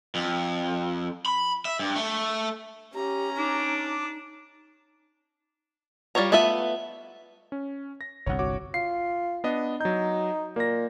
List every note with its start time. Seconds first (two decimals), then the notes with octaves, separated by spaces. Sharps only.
0.15 F2
1.26 B5
1.65 E5
1.79 G2
1.96 A3
2.94 C#4 G4 A#5
3.37 D4 D#4 D6
6.15 G3 F4 C5 C#5 A#5
6.32 A3 B3 F4 B4 E5
7.52 C#4
8.01 A#6
8.26 G1 C2 C#5 F#5
8.39 F#4 C#5 D6
8.74 F4 C7
9.44 B3 D4 D#5
9.81 F#3 D#4 G6
10.56 A#2 A#3 A#6